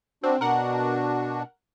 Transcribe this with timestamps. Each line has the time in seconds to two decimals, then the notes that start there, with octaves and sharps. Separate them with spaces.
0.23 C4 D4 F#4
0.41 B2 D4 F#4 A#4 F#5